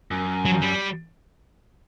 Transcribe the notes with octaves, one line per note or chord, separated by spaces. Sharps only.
F#2
F#3
G3